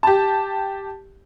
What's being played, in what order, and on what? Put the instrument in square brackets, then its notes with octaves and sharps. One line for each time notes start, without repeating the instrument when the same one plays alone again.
[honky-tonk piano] G4 A5